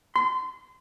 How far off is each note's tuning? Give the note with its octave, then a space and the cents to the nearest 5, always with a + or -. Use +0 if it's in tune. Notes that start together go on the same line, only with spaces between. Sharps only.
C6 -30